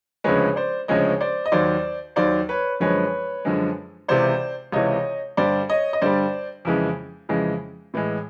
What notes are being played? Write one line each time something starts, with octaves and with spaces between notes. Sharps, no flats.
D2 C#3 F3 G#3 B4 C#5
C5 D5
D2 C#3 F3 G#3 C#5 D#5
C5 D5
D#5
D#2 D#3 F#3 C5 D5
D#2 D#3 F#3 C5 D5
B4 C#5
F#2 D3 F3 G#3 B4 C#5
F#2 D3 F3 G#3
C#2 C3 E3 C5 D5
C#2 C3 E3 C#5 D#5
G2 D3 G3 C5 D5
C#5 D#5
D#5
G2 D3 G3 C5 D5
F2 C#3 E3 G#3
F2 C#3 E3 G#3
A2 E3 G#3